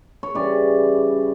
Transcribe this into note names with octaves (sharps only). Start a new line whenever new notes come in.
C#5
C#3 E3 G3 D5